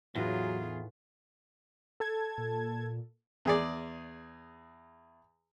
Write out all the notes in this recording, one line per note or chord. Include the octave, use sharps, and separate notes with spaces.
E2 A2 F#3 D#4 F4 G#4 B4
A4 A5 G#6
A#2
E2 G#4 D5